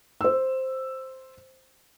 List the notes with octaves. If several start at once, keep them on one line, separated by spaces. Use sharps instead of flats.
C5 E6